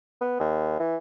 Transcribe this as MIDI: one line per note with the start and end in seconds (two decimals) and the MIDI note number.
0.21 0.37 59
0.40 0.75 39
0.79 0.96 52